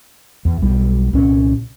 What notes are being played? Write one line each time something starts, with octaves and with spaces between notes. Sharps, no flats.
E2
B1 G3
C2 A#2 C#4